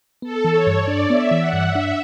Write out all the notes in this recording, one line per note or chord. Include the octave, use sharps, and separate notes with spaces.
B3 A4
E3
C#5
G2
D5
D4
B3 E5
E3
F#5
G2
E5
D4